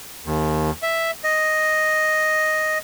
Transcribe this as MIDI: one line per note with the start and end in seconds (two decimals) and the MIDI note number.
0.26 0.71 39
0.83 1.11 76
1.24 2.78 75